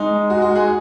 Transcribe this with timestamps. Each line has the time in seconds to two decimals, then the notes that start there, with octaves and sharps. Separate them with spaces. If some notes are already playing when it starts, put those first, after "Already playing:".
Already playing: G#3 D#4
0.30 F#4
0.42 F#4
0.55 G#4